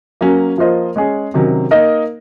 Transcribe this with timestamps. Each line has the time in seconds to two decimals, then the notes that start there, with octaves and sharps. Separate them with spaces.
0.21 F#3 A#3 C#4
0.58 F3 A#3 F4 C5 D#5
0.96 G#3 C#4 G#4 C#5
1.34 C3 D#3 F#3 C#4
1.71 A#3 D#4 A#4 D#5